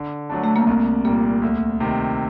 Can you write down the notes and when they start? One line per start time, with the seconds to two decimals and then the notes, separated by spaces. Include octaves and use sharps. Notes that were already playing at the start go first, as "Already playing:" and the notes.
Already playing: D3
0.29 F#3 A3 D4
0.44 A3
0.56 A#3
0.67 C2 C4
1.05 A#2 G3 A#3
1.42 D2
1.80 C3 D#3